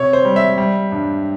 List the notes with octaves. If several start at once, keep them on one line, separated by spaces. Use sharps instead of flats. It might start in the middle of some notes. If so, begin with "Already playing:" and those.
Already playing: C3 C#5
C5
G3
E5
G3
G2